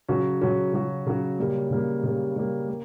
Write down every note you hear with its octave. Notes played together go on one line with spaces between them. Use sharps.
C#3 F#3 C#4 F#4
C#3 F#3 C#4 F#4
C#3 F#3 C#4 F#4
C#3 F#3 C#4 F#4
C#3 G3 A#3
C#3 G3 A#3
C#3 G3 A#3
C#3 G3 A#3
A#3